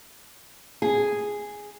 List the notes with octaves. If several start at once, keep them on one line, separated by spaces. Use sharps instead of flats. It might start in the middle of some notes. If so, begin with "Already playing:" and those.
G#4